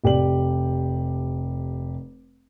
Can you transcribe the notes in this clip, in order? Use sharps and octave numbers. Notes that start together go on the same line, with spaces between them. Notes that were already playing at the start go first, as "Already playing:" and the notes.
F1 G4 D5 F#7